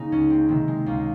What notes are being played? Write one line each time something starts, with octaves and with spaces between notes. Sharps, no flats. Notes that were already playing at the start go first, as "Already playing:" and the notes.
Already playing: C#3 A#3 D#4
C#2 C#4
C4
C3 D#3 C4
G#3
C#2 A#3